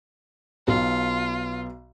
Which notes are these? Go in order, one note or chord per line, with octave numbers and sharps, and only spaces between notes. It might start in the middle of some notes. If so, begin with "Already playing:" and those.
B1 B3 F4